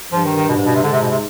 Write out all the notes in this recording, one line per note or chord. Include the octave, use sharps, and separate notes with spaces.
G2 F3
D#3
D#3
B2
G#2
B2
C3
G#2 D3
C3
B2
C3